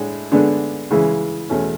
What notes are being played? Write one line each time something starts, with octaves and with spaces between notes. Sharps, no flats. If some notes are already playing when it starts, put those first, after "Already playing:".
Already playing: A2 G#3 D4
D3 G#3 B3 D4
C#3 E3 G#3
E2 B2 A3 C#4